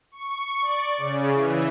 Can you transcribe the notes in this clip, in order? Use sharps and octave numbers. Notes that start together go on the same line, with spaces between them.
C#6
D5
C#3
E3